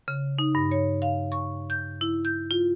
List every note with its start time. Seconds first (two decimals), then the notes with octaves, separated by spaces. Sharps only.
0.08 C#3
0.39 D#4
0.55 G2
0.71 C#5
1.02 F5
1.32 C#6
1.70 G6
2.01 E4
2.25 G6
2.51 F4